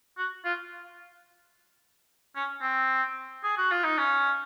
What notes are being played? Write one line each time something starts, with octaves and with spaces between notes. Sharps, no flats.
F#4
F4
C#4
C4
G#4
F#4
F4
D#4
C#4